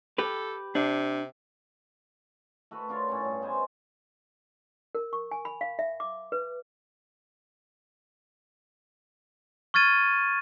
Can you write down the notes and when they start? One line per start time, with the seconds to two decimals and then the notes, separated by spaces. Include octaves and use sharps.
0.18 G4 A4 B4
0.75 C3 D4
2.71 A3 F#4 B4
2.89 D4 F4 A#4 C#5
3.08 A2 C#4
3.24 G2
3.42 B3 C5 D#5 G#5
4.95 A#4
5.13 C#6
5.31 G#5
5.45 B5
5.61 F5
5.79 E5
6.00 D6
6.32 B4
9.74 C#6 F6 G#6 A6 D#7